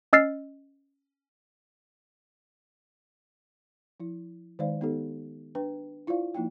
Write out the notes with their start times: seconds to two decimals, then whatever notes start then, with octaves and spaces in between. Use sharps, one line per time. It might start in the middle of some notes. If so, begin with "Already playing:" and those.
0.13 C#4 D#5 E6 F6 A6 C7
4.00 F3 E4
4.59 D#3 G#3 D#4 C5 D5 F5
4.81 B3 D#4 G4 A4
5.55 D4 B4 G5
6.07 E4 F4 C5 D5 F5
6.34 F3 A#3 D#4 E4 G5